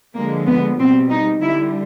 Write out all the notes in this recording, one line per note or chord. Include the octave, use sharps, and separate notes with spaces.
D3 F3 G#3 A#3
B3
B2 G3 C4
D#4
D3 G3 E4